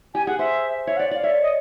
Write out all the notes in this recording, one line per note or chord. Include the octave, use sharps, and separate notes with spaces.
G4 G#5
G#4 F#5
C5 E5
C#5 E5
F#5
D5
D5 F5
C#5 E5
D#5